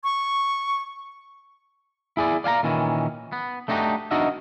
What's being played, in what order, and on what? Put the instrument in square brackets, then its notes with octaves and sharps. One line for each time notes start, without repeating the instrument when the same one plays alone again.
[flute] C#6
[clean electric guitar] E4 G#4 D5
D5 F5 G#5 A#5
A#2 D#3 E3 C#4
B3
A3 D4 D#4 F#4 G4
D4 D#4 F#4 A#4 D#5 E5